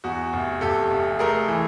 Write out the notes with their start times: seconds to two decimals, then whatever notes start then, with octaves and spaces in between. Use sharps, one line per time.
0.04 E2 F#4
0.33 F1
0.61 F1 G4 A4
0.91 F1
1.19 A3 G#4 A#4
1.48 E3